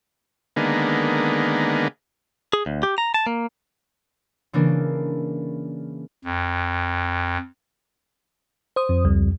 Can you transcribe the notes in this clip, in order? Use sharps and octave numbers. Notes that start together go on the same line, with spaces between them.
D3 D#3 G#3 A#3 B3
G#4
D2
G4
A#5
A5
A#3
C#3 E3 A#3 D4
F2
C5 D#6
F2
C#2 G3